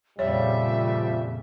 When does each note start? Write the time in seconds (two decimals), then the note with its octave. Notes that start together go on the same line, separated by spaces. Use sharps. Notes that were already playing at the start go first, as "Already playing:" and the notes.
0.19 F2 A#2 C#3 F3 G3 C#5 E5